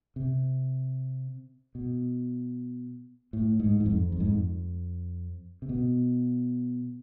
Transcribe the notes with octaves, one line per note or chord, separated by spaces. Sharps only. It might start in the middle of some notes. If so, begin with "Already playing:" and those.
C3
B2
A2
G#2
G#2
F2
F2
G#2
F2
C3
B2